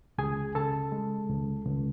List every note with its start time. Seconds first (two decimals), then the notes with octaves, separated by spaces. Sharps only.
0.18 C#2 G#4 G#5
0.55 C#3 A4 A5
0.92 G#3
1.29 C#2
1.65 C#2